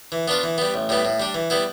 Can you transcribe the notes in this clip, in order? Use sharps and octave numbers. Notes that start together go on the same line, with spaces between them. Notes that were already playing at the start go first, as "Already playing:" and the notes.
E3
B3 D4 F4
E3
G3 B3
A1
A2 G3 B3
A2
G3 D4
E3
G3 B3 E4